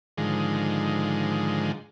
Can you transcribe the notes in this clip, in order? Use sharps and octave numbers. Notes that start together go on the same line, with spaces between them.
G#2 D3 D#3 F3 G#3